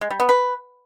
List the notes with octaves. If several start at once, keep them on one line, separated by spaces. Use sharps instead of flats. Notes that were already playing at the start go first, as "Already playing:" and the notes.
G#3
G3
B3
B4